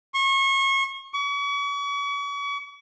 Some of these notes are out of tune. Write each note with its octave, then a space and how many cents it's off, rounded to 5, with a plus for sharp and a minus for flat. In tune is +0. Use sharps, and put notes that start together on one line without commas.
C#6 -30
C#6 +40